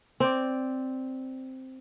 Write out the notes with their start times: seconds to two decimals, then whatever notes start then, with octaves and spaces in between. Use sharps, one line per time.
0.20 C4 D5